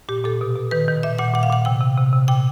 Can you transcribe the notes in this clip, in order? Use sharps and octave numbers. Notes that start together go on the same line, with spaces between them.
A#2 G4
A#2 A4
B2
B2
D#3 B4
D#3
A#2 E5
A#2 F#5
A#2 F#5
F5
A#2 F#5
C3 G5
C3
C3
C3
A#2 G5